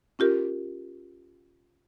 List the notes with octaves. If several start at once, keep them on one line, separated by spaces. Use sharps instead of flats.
C#4 F4 G4 A#4